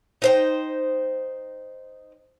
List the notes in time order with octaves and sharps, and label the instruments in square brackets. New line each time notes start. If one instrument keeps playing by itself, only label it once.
[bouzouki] D#4 C5 G5